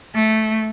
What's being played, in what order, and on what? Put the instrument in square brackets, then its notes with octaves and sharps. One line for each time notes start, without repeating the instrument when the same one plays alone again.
[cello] A3